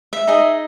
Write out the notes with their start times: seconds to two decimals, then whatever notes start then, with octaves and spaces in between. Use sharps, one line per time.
0.13 E5
0.27 D#4 G#4 D#5